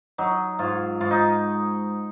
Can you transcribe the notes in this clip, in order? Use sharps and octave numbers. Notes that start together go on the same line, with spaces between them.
F#3 D#4
G#2 F4
G#2 F4
D#4